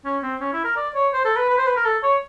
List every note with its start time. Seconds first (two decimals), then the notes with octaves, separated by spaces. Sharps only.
0.05 C#4
0.23 C4
0.40 C#4
0.53 E4
0.65 A#4
0.77 D5
0.95 C#5
1.13 C5
1.25 A4
1.37 B4
1.49 B4
1.58 C5
1.67 B4
1.76 A#4
1.85 A4
2.03 C#5